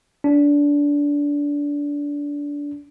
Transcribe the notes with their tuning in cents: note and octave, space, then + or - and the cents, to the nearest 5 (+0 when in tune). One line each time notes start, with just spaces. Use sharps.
D4 -20